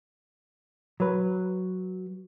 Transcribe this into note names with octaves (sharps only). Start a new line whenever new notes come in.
F#3 B4